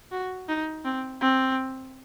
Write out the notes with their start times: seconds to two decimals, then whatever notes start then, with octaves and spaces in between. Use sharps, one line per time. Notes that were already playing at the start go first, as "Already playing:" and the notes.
0.12 F#4
0.49 D#4
0.85 C4
1.21 C4